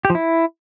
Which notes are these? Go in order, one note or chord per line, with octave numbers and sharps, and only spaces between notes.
G4
F3
E4